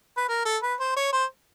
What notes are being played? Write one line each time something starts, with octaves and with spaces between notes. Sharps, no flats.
B4
A#4
A4
B4
C5
C#5
C5